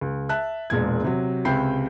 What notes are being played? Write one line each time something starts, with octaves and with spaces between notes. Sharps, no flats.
C#2
E5 A5 F#6
E1 A#2 G#3 G#6
C3 F#3
C#2 C3 G5 B5 G6 C7